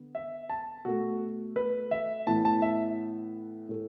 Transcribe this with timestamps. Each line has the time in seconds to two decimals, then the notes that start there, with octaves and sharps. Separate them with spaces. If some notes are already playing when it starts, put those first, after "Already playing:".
Already playing: D3 B3
0.15 E5
0.49 A5
0.85 B2 A3 F#4
1.56 B4
1.91 E5
2.27 A2 E3 B3 A5
2.45 A5
2.62 E5
3.69 A2 A3